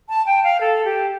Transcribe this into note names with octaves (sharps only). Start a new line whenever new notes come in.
A5
G5
F5
A4
G4